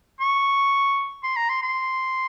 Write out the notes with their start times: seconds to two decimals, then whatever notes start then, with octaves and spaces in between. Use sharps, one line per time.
0.20 C#6
1.23 C6
1.36 A#5
1.50 C6
1.62 C6